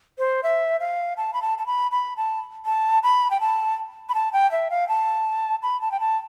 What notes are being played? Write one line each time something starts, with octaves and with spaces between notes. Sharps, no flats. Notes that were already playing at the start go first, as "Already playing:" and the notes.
C5
E5
F5
A5
B5
A5
A5
B5
B5
A5
A5
B5
G5
A5
B5
A5
G5
E5
F5
A5
B5
A5
G5
A5